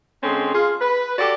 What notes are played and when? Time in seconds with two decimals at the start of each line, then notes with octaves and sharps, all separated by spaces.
0.22 D3 G#3 C4 C#4
0.52 F4 G#4
0.81 B4
1.18 F#4 G4 A4 D5